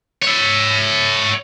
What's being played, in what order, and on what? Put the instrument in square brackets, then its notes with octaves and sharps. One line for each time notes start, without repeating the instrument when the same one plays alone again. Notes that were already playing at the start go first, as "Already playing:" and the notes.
[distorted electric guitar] C#5 E5